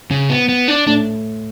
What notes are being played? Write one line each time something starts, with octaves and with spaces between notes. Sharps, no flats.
C#3
B3
B3
D4
A2 A3 D4